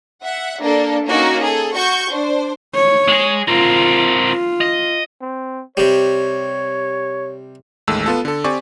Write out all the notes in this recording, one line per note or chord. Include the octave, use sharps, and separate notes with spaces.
E5 F#5
A#3 D4 A4
A#3 C#4 D#4 F#4 A#4
G#4 A4
F#4 C#6 G6
D4 C5
C#5
G#3 G#4
C4 F4 A#4
F4
D#5
C4
C3 G3 C#5
A1 D#2 G#3 A3 E6
B3 F4 A4
D3 A4
C4 G4 D5 G#5 C#6